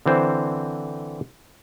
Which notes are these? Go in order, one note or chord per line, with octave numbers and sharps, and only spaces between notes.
D3 E3 C4 C5